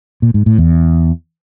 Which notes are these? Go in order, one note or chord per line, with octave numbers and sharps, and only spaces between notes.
A#2
G#2
A2
E2